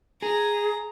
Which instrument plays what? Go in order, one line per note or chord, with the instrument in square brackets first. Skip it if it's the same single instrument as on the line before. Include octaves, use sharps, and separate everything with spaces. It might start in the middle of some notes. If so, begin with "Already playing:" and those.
[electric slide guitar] G#4 [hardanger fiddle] A#5